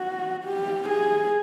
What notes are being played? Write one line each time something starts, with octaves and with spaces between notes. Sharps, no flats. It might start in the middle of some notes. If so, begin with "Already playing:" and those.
Already playing: F#4
G4
G#4